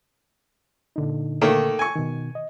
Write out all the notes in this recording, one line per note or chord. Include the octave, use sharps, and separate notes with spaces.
A#2 D3 D#4
D#3 A3 A#3
G#5 C#6
B2 D#3
D#5